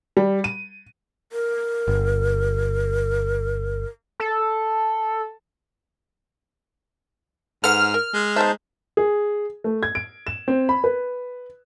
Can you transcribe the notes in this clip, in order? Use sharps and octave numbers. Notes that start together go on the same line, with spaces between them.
G3
D#7
A#4
G1
A4
G#2 A4 B4 F#5 F6
A#4
G#3
B3 D#4 C5 E5 A5
G#4
A3
G#6
D7
E7
C4
B5
B4